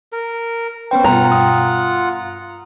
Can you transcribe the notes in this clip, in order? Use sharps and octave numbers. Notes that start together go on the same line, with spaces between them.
A#4
B3 C#4 B4 C5 G5
G2 B2 F4 F#5 A#5
D#6